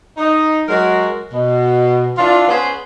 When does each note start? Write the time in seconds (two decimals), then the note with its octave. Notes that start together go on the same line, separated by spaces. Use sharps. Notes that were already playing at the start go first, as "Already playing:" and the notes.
0.17 D#4
0.68 F#3 G#3 F#4 A#4
1.32 B2
2.17 E3 D4 F4
2.49 B3 C#4 G#4 B4 C5